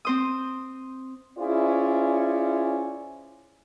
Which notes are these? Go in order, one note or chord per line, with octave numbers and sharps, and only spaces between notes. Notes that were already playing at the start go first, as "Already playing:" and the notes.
C4 C5 D#6
C#4 E4 F4 G#4 C5 D5